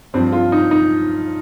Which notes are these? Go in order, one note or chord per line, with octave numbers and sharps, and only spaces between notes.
G2 F3 C4
F4
D#4
D#4